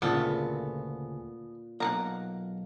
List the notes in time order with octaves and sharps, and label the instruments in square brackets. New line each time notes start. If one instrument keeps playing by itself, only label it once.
[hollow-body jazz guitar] D2 C#3 [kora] A#2 [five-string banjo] B3 A4
[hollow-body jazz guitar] B1 A#3 [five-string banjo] F#5 A5 A#5